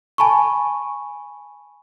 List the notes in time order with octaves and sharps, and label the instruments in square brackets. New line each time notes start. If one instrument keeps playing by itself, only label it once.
[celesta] G#5 A5 B5 C#6